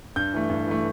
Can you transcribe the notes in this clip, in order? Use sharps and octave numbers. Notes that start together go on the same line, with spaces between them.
G2 G6
E3 A3
G2
E3 A3